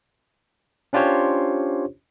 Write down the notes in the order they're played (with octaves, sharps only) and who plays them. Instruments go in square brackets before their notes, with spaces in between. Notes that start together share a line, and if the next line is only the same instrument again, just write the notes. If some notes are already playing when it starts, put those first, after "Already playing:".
[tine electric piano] C#4 D4 F4 G4 C5 C#5